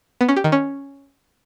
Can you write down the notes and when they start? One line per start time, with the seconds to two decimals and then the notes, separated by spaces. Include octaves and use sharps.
0.21 B3
0.29 C#4
0.36 G4
0.44 D#3
0.52 C#4